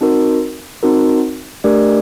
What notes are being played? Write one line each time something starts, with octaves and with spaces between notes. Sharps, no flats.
C4 D#4 F#4 A#4
C4 D#4 F#4 A#4
A3 D4 G4 A#4 D5